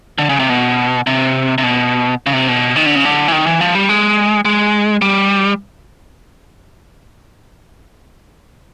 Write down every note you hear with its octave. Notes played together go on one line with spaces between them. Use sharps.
D3
C#3
C3
B2
C3
C3
B2
C#3
C3
B2
D#3
D3
C#3
D3
E3
D#3
E3
F3
G3
G#3
G#3
G3